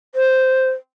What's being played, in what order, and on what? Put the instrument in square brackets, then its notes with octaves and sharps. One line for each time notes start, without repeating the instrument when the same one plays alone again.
[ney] C5